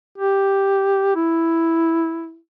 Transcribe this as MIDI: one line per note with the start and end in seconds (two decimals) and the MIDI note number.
0.18 1.13 67
1.16 2.37 64